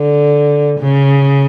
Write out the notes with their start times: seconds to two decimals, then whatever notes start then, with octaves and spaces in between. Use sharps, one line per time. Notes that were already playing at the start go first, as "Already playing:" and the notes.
Already playing: D3
0.80 C#3